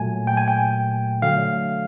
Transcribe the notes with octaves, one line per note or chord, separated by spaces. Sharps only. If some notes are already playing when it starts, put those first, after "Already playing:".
Already playing: A#2 F#3 A3 G#5
G5
G#5
G5
D3 F#3 A3 F5